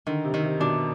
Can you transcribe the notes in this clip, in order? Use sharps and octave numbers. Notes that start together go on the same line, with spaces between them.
D3 D#3
C3
D#3
C3
B2 D4